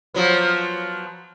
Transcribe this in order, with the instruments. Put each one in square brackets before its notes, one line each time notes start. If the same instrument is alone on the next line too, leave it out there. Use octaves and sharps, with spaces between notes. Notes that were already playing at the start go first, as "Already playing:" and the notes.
[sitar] F3 F#3 B3